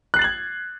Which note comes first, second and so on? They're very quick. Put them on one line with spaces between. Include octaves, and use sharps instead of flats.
F#6 C7 A6 F#7 G#6